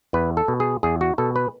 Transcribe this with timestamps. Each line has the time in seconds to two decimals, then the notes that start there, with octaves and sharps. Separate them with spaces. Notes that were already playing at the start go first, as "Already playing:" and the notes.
0.13 E2 B4
0.37 A4
0.48 B2
0.60 G#4
0.83 E2 G#4
1.01 F#4
1.18 B2 A4
1.36 B4